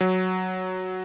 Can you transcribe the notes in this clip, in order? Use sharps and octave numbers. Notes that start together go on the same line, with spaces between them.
F#3